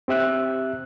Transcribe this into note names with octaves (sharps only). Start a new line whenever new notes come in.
C4 G4 E5 F#6